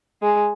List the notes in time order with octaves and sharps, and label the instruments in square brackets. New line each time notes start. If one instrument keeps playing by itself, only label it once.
[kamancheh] G#3